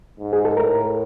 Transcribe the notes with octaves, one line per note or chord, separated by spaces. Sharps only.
G#2
G#4
A4
A2 A#4